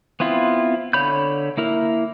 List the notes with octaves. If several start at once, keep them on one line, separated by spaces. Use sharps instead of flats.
B3 C4 E4 F4
D3 C#5 B5 G6
A#3 E4 A#4